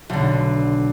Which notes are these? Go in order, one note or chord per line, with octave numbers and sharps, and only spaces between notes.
B1 D3